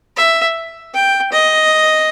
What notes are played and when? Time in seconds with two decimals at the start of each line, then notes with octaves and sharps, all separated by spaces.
0.16 E5
0.94 G5
1.32 D#5